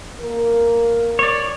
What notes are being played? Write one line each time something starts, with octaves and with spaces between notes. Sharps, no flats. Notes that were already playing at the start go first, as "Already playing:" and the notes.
A#3 A#4
C#5 D5